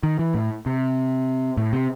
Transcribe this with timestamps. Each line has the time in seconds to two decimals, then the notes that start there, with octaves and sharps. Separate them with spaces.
0.03 D#3
0.19 E3
0.34 A2
0.66 C3
1.57 A2
1.73 C3